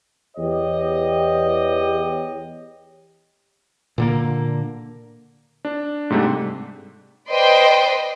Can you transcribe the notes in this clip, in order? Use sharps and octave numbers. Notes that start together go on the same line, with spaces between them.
E2 G4 C#5 D#5
A#2 D3 A#3
D4
G#2 C3 G3 A3 D4
B4 C5 D5 D#5 G5 C6